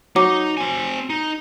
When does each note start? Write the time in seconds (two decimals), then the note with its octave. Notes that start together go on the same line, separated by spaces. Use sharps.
0.16 F#3 D#4 D6
0.57 C4 G#5
1.10 D#4